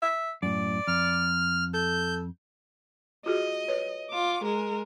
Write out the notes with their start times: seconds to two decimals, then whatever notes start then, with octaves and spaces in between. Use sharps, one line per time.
0.02 E5
0.43 F#2 A2 D5
0.88 F2 F6
1.74 A4 G6
3.26 F4 F#4 G#4 D#5
3.68 B4 C#5
4.10 F4 D6
4.44 G#3 A#4